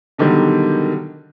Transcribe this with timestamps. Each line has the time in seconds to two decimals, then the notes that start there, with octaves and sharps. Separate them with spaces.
0.18 B2 D3 D#3 F#3 G3